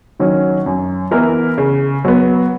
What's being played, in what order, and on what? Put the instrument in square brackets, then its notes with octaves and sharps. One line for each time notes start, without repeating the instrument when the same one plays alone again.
[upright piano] D#3 F#3 C#4
F#2
E3 B3 E4 A#4
C#3
F#3 B3